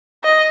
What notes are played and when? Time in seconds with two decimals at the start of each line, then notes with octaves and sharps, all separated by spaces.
0.24 D#5